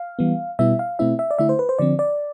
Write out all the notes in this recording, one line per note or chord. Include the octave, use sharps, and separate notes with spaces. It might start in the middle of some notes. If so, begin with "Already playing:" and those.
Already playing: F5
E3 G3 B3
B2 G3 B3 E4 E5
F5
B2 A3 C4 E4 E5
E5
D5
D3 A3 E4 E5
C5
B4
C5
D3 F3 C4 D5
D5